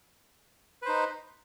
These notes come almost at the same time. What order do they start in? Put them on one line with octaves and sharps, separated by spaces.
B4 C5 D#4